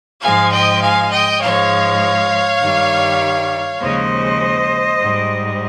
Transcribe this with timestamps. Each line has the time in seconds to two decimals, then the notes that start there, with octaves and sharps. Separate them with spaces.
0.21 G#2 F3 G#3 F5 G#5
0.51 D#5 G5
0.81 F5 G#5
1.11 D#5 G5
1.41 G#2 F3 G#3 C#5 F5
2.61 G2 D#3 G3
3.80 D#2 C#3 F3 G#3 C5 D#5
5.00 G#2 G3